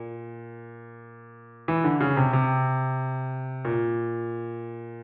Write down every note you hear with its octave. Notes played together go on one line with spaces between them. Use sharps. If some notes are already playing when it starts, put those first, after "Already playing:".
Already playing: A#2
E3
D3
C#3
C3
C3
A#2